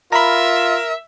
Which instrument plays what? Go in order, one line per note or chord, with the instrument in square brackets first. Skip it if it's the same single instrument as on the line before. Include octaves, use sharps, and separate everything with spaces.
[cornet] F4 [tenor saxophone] A#4 [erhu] E5 [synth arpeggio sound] A#5 B5